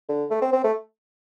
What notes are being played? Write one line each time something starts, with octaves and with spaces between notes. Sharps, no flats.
D3
A3
C4
C4
A3